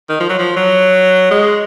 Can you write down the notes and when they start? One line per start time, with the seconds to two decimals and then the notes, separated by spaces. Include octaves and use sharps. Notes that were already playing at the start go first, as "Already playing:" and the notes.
0.09 D#3
0.20 F3
0.29 F#3
0.39 F3
0.56 F#3
1.31 G#3